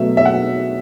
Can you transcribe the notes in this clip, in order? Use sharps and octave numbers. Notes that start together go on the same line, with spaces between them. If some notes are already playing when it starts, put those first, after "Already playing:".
Already playing: B2 F#3 A3 E5
E5
F#5